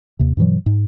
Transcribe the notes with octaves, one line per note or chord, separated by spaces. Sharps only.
D#2 C3
G2 B2 E3 F#3
G#2